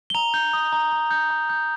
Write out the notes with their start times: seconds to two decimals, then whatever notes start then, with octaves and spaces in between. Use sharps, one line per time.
0.10 G7
0.15 A#5 F7
0.34 G6
0.53 D#6
0.73 A#5
0.92 A#5
1.11 G6
1.30 A#5
1.49 G6